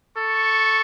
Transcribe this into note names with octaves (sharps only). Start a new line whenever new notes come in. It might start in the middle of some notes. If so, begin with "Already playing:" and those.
A4 C#6